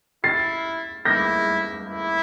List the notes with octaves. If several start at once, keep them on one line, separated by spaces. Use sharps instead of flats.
E4 A6 C7
E4 G6 A#6
E4